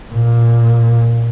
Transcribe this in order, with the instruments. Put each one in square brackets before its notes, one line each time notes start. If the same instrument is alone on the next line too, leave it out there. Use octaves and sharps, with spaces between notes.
[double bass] A#2